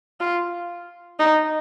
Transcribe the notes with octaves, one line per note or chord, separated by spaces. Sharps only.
F4
D#4